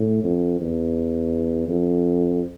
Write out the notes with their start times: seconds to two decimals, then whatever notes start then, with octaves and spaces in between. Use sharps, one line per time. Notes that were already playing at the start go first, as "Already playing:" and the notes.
Already playing: A2
0.24 F2
0.61 E2
1.68 F2